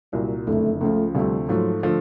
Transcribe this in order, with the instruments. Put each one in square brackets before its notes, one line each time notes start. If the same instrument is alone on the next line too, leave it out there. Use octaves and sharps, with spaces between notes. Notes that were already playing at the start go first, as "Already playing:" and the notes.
[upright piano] C2 A#2 F#3 [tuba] G3
[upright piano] F#1 F2 D3 [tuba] A3
[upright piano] C#2 C#3 F3 [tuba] A3
[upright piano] D2 C3 F3 A3 [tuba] G3
[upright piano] G#2 F3 A3 [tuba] F#3
[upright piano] D3 F3 A3